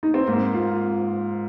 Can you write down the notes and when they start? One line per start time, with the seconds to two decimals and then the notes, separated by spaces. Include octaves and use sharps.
0.03 D#4
0.14 C4
0.27 G#2 A#3
0.54 F4